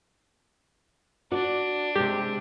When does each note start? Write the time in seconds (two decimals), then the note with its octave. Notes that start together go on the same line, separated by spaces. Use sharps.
1.31 D4 F#4 D5
1.95 C3 G#3 G4